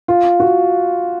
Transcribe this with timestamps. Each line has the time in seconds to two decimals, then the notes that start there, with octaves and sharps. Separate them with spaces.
0.08 F4
0.40 F#4